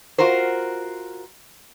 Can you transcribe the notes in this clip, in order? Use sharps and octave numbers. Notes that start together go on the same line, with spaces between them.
F4 F#4 A#4 C5